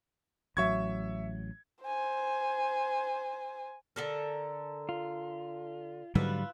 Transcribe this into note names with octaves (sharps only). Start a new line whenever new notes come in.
A1 F#3 E5 C#6 G#6
C5 G#5
D3 A4 A#4
F4
G#2 D3 F#3 G3 E4 F4 B4